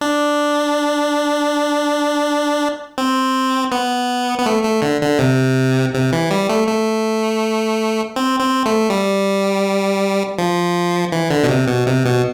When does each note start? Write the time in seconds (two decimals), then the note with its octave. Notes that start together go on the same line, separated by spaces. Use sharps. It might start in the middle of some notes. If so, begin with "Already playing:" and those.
0.01 D4
2.98 C4
3.72 B3
4.39 B3
4.46 A3
4.63 A3
4.82 D3
5.01 D3
5.19 C3
5.94 C3
6.13 E3
6.31 G3
6.49 A3
6.68 A3
8.16 C4
8.40 C4
8.66 A3
8.90 G3
10.38 F3
11.12 E3
11.30 D3
11.43 B2
11.49 C3
11.67 B2
11.87 C3
12.05 B2